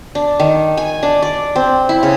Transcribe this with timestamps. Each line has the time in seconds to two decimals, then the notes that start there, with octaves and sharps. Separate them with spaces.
0.15 D4
0.40 D#3
0.77 G#5
1.03 D4
1.22 D5
1.56 C4
1.89 E4
2.03 C#3